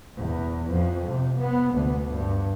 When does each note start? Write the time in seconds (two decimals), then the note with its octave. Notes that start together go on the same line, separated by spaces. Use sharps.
0.17 E2
0.71 F2
1.08 C3
1.39 B3
1.74 D2
2.13 G2